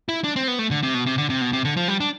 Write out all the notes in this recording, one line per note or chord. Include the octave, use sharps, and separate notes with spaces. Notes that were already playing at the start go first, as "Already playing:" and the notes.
E4
D4
C4
B3
A3
D3
C3
B2
C3
D3
C3
B2
C3
D3
F3
G3
D4